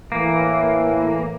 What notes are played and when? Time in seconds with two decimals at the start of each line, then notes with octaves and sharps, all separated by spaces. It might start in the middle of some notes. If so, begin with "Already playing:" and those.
0.12 A2 E3 A#3